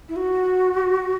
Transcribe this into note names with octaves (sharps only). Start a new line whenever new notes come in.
E4
F#4